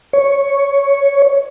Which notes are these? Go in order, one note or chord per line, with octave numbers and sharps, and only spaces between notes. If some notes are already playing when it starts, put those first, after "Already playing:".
C#5